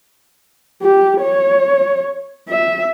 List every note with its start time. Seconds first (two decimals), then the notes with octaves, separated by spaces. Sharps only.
0.83 G4
1.22 C#5
2.49 E5